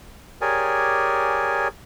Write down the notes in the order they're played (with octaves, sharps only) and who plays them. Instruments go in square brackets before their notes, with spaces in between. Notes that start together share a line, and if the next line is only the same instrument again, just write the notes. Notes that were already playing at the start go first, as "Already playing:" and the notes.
[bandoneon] G4 G#4 A#4 C#5 D5 G#5